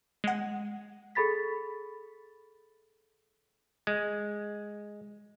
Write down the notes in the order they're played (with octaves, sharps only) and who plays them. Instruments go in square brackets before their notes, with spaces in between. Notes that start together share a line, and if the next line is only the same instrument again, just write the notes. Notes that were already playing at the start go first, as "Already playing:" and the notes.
[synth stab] G#3 F#5
[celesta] G#4 A4 B5 A6 B6
[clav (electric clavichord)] G#3